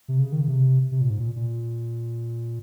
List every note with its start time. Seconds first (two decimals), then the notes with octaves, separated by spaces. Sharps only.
0.08 C3
0.19 C#3
0.32 D#3
0.41 C#3
0.48 C3
0.91 C3
1.01 A#2
1.10 G#2
1.20 A#2
1.36 A#2